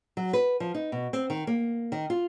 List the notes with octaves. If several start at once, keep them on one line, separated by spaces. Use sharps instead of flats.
F#3
B4
F3
D#4
B2
C4
D#3
A#3
D#3
F4